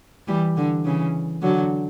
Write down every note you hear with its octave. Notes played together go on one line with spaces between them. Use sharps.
E3 G3
D3
C#3 E3
D3 F#3